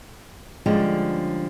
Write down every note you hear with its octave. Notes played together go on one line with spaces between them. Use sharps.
D3 F3 G3 G#3 C#4